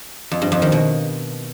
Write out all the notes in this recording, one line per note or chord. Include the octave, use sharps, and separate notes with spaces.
F2
G2
F2
D#3
B2